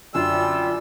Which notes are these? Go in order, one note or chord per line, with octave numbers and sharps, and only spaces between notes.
F#2 D3 G3 F4 G#5 E6